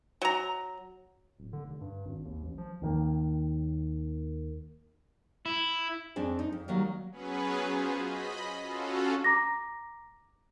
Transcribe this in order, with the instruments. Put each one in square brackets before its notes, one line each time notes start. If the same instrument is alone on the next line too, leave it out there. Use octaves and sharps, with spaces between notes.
[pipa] F#3 A#5
[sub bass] D1
D3
F1
G2
G#1
D#2
A1
F3
[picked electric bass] D#2 D#3 A#3
[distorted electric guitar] E4
[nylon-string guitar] F2 C4 D4 G#4
D#4
F2
D#3 F#3 G3 A#3
[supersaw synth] F#3 B3 C#4 G#4 B4
F4 F#4 G#4 C5
D#5 B5
C#4 F4 F#4 A4
[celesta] A#5 D6 A#6